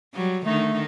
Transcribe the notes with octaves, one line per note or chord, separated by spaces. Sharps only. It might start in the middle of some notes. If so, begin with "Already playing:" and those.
F#3 G3
D3 D#3 A3 D#4